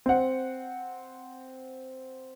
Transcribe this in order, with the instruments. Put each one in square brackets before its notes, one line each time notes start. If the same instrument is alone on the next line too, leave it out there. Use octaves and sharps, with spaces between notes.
[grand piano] C4 F#5